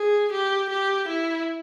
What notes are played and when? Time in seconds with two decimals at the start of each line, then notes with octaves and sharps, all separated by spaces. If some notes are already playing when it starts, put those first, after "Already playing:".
Already playing: G#4
0.32 G4
0.69 G4
1.08 E4